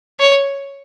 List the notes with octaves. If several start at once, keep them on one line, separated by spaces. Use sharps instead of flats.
C#5